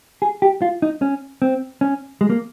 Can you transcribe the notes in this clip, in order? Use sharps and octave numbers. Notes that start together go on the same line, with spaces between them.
G#4
G4
F4
D#4
C#4
C4
C#4
G#3
A#3